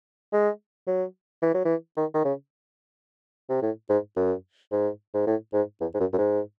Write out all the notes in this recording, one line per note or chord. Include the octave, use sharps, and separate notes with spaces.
G#3
F#3
E3
F#3
E3
D#3
D#3
C#3
C3
A2
G#2
F#2
G#2
G#2
A2
G#2
E2
G#2
F#2
F#2
G#2